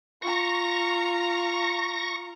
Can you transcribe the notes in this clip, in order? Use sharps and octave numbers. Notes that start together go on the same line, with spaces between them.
F4 A#5 C#6 A#6